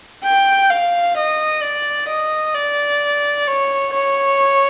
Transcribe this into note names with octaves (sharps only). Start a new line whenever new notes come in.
G5
F5
D#5
D5
D#5
D5
C#5
C#5